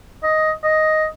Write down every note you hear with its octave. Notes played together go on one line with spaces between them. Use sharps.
D#5
D#5